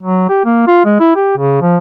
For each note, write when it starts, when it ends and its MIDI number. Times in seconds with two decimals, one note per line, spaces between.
0.03 0.27 54
0.29 0.42 67
0.45 0.67 58
0.67 0.81 65
0.85 0.99 56
1.00 1.14 64
1.16 1.33 67
1.38 1.59 49
1.61 1.77 53